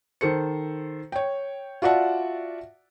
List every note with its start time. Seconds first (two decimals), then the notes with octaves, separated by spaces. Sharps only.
0.21 D#3 A4 C5 C#7
1.12 C#5 G5
1.82 F4 F#4 D5 E5 F#5 A5